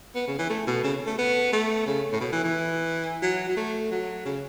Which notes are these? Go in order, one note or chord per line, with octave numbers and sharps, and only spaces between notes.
B3
C#3
E3
A3
B2
C#3
A3
B3
A3
C#3
A2
B2
E3
E3
F#3
F#3
A3
F#3
C#3